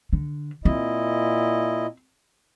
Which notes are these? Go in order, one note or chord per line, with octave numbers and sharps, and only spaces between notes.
D3
A#2 C4 E4 D#5